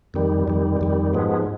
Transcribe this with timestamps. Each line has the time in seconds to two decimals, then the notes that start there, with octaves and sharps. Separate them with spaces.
0.14 F2 D#3 G3
0.47 F2 D#3 G3
0.81 F2 D#3 G3
1.13 G#2 F3 G#3 B3